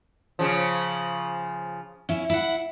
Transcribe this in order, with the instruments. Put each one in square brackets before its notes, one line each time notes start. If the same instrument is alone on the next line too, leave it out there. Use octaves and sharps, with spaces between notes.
[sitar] C#3 F3
[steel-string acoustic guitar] C#4 E4
E4 F#5